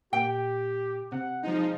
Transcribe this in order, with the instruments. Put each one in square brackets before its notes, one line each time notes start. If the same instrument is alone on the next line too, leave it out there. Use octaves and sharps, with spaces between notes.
[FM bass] A#2 [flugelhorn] G4 [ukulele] G5
[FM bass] C3 [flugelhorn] F#5
[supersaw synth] F3 D#4 [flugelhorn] G#3